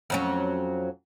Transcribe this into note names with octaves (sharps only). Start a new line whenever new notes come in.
F2 F#3 C#4